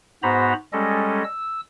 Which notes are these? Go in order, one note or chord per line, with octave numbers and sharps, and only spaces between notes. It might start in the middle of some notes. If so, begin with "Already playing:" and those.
G#2 B3 F#4 C5 A#5 B5
G3 G#3 C#4 A4 D#5
E6